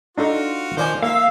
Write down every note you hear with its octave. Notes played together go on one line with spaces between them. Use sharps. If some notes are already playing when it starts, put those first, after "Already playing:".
D4 D#4 F4 F#4 A4
D#3 F3 C5 D5 G#5
A#3 E5 F5 E6